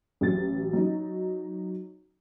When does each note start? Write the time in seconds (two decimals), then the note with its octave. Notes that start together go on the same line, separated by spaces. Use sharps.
0.21 A1 F#3 A6
0.73 F#3 D#4